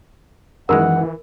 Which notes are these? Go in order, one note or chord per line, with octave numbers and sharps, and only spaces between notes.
F#2 D#3 E3 G#3 A#4 F#5 B5